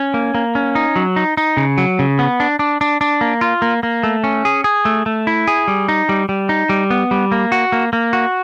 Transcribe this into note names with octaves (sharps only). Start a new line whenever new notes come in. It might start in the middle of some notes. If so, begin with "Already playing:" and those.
Already playing: C#4
A#3
A#3
C#4
D#4
F#3
D#4
D#4
C#3
F#3
C#3
B3
D4
D4
D4
D4
A#3
F4
A#3
A#3
A3
C#4
G#4
G#4
A3
A3
E4
G#4
G3
D#4
G3
G3
D#4
G3
B3
G3
A#3
F#4
A#3
A#3
F#4